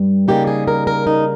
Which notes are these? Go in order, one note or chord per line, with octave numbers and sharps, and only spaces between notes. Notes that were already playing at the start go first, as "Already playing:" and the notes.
Already playing: G2 G3
C#3 G3 A#3 D#4 G4
G#4
A#4
A#4
D#4